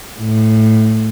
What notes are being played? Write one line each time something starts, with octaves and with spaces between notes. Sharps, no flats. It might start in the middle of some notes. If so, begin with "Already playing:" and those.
A2